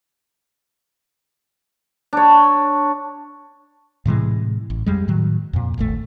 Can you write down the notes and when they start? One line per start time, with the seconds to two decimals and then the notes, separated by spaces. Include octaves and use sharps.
2.13 D4 C#5
4.05 A2 C3 E3 G#3
4.70 A1
4.86 F2 G3 G#3
5.08 A2 D#3 F#3
5.53 F2 A#2
5.78 D#1 G#1 A3